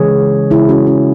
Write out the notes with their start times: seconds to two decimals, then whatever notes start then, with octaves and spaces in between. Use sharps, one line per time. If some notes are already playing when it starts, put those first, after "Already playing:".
Already playing: C#3 E3 G#3 G#4 C#5
0.50 C#3 G#3 E4 G#4
0.69 C#4 F#4
0.87 C#4